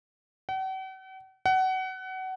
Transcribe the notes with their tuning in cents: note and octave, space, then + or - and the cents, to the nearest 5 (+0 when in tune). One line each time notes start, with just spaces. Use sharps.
F#5 +45
F#5 +25